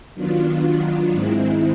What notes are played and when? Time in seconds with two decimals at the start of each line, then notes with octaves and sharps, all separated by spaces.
0.14 D#3 F#3 B3 D4 F4
1.13 G#2 D#3 G#3 C4 E4